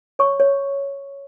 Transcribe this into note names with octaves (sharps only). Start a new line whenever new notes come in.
C#5 C#6
C#5